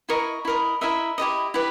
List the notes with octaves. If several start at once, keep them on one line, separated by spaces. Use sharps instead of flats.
E4 A#4 D#5 C#6
E4 A#4 D#5
E4 A#4 D#5 E5
E4 G4 B4 D#5
E4 G4 B4